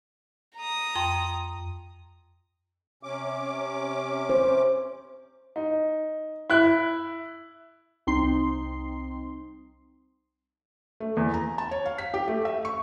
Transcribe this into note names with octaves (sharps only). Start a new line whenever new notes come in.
A#5 D#6
F2 G5 C6
C3 C#4 D6
C5
D#4
E4 F#6
C2 C4 D#4 C6 C7
A3
E2
A#5
A5
C#5
F5
B6
G4
A3
E5
C#6